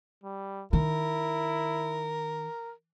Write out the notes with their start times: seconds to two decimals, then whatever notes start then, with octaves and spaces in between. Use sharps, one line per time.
0.24 G3
0.73 D#3 E4 A#4